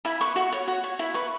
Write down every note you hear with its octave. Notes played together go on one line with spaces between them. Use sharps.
E4 B5
B4 C#6
F#4 C#6
C#5
F#4
C#5
E4 B5
B4 C#6